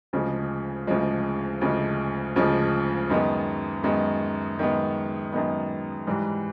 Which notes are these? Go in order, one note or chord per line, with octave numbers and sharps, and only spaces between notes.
D2 C#3 F3 G#3
D2 C#3 F3 G#3
D2 C#3 F3 G#3
D2 C#3 F3 G#3
F#2 D#3 G#3 B3
F#2 D#3 G#3 B3
F#2 D#3 G#3 B3
F#2 D#3 G#3 B3
G#2 E3 G3